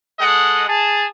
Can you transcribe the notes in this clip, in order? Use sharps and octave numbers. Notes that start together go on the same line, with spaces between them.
G#3 A4 D#5 F#5
G#4 A5